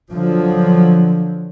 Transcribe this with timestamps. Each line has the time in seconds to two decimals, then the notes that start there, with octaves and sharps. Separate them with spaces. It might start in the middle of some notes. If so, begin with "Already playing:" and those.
0.13 D3 F3 F#3